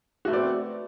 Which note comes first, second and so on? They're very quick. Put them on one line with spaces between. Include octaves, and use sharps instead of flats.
F#4 A3 B3 D5 C4